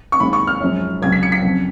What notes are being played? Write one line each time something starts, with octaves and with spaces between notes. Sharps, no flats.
C#6
D#2 D#3 G#3 B5
C#6
F6
F#2 F3 G#3
C#2 C#3 F#3 G#6
B6
C#7
B6
F2 C#3 F#3